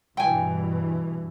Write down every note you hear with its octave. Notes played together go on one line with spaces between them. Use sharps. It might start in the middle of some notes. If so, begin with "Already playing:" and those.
G2 B2 E3 G5 G#5